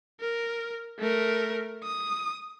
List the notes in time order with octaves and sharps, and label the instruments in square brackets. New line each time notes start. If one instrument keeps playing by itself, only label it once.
[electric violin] A#4
A3 A#4
D#6